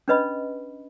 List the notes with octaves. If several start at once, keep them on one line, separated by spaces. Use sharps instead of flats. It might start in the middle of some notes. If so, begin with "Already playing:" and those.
C#4 D4 B4 D#5 B5